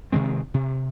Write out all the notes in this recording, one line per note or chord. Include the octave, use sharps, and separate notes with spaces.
C3 D#3 G#3 C4
C3